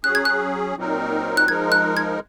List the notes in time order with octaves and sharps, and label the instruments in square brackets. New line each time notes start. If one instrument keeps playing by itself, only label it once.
[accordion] F#3 C#4 G#4 [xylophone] F#6
[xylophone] G#6
F#6
[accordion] A#2 F#3 C4 D#4 A#4
[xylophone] F#6
[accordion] F3 G#3 D#4 A#4 [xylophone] G#6
[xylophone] F#6
G#6